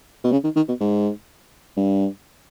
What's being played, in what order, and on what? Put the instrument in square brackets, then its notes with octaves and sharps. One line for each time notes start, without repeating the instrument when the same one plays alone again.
[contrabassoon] B2
C#3
D#3
D#3
B2
G#2
G2